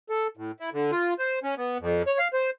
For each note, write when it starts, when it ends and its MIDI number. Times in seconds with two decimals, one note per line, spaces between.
0.09 0.27 69
0.37 0.51 45
0.60 0.70 64
0.73 0.91 50
0.92 1.14 65
1.19 1.39 72
1.43 1.55 61
1.57 1.78 59
1.80 2.02 41
2.07 2.18 73
2.19 2.28 77
2.33 2.50 72